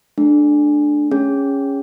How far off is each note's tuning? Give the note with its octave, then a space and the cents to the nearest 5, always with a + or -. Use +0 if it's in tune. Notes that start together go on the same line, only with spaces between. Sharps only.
A3 -35 D4 +10
C#4 +0 G#4 -20